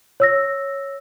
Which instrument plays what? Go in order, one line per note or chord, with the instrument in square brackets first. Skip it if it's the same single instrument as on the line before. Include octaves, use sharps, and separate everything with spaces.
[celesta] C#5 E6 A#6